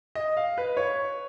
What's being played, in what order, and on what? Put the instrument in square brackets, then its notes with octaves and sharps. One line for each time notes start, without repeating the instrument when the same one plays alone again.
[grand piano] D#5
F5
B4
C#5